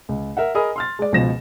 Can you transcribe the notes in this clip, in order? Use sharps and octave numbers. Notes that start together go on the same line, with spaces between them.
C#2
A#4 E5 F#5
G#4 A#4 D#5 B5 D#6
C6 F6 A6
G#3 D5
C#2 B2 F3 A#6 E7